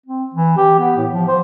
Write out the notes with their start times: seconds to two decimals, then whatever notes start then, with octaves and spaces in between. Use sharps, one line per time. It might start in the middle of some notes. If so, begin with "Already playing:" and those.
0.06 C4
0.34 E3
0.57 G4
0.79 B3
0.97 A2
1.12 F3
1.28 C5